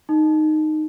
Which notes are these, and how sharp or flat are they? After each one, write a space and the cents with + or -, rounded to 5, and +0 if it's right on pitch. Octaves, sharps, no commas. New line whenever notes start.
D#4 -10